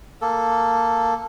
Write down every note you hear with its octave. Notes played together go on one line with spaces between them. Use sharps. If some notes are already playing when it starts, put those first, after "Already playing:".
A#3 A4